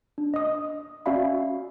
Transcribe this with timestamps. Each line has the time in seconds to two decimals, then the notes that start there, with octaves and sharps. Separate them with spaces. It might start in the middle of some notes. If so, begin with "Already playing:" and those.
0.18 D4
0.34 D#5 D#6
1.06 C#4 F#4 D5 E5 F5 B5